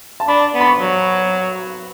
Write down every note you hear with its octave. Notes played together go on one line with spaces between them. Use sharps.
A5
D4 B5
B3
B5
C#6
F#3